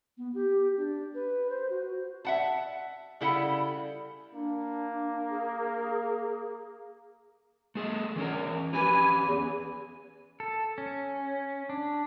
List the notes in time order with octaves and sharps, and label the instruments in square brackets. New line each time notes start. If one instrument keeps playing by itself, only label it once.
[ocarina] B3
G4
D4
B4
C5
F#4
F#4
[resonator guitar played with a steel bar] E5 F#5 A5
C#3 G3 E4 A4 F#5
[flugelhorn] A#3 [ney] D4
[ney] G#4
[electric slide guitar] A3 G#4 A4
E3 C#4 A#4
[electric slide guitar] C#4 G4 B4 [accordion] G#5 [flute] B5
[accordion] E2
[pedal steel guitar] A4
C#4
D4